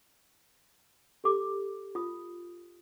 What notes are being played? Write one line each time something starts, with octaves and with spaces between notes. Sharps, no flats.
G4 A4 D6
F4 D#6